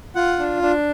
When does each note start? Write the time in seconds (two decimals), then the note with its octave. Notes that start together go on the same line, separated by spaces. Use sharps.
0.15 F4 F#5
0.39 D4
0.62 D4